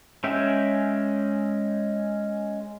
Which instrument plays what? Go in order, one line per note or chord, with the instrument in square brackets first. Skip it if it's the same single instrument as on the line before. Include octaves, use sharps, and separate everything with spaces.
[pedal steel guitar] G#3 C#4 E5 G5